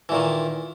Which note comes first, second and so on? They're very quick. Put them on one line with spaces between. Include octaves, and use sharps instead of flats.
E3 A#2 D#3